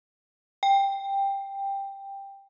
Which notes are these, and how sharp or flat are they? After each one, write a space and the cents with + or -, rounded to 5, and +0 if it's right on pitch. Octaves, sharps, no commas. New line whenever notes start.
G5 +10